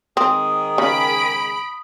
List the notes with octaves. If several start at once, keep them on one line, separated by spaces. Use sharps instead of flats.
G#2 D#3 C4 G#4 D#6
C#3 B5 D7